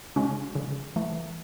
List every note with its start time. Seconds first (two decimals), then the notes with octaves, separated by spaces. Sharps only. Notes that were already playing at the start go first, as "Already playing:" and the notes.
0.16 C#3 G#3 C#4 F#4
0.55 C#3
0.96 E3 A3